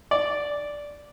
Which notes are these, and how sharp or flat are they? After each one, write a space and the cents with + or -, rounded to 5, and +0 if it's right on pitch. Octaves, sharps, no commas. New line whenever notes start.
D5 -5